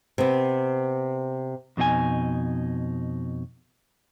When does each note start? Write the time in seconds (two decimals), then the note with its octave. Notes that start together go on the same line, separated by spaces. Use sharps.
0.18 C3 B3
1.77 F2 B2 D#4 F4 G#5